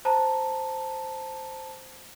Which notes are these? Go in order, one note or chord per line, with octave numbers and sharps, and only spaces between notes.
C5 A5 A#5